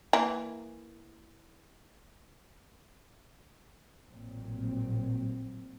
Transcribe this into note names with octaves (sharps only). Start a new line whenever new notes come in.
E3 A#3
A1 A#2 F#3 C4